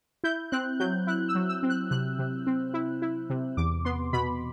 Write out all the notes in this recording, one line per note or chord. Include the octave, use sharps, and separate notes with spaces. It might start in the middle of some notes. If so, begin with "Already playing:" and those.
E4 G6
C4 F#6
F#3 G6
E4 F#6
E6
F#3
E6
C4
F#6
C3 F#6
C3
C4
E4
E4
C3
E2 D6
B3 C6
B2 B5